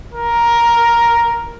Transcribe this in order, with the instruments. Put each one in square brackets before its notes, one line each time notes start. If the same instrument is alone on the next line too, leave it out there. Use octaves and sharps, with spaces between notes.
[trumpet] A#4